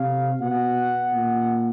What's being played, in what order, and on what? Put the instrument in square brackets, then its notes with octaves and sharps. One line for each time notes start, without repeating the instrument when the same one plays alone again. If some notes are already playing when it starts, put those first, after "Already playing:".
Already playing: [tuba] C3 [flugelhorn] F5
[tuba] B2 [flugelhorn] F#5
[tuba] A#2